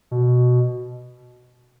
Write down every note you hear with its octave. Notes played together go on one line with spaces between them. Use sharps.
B2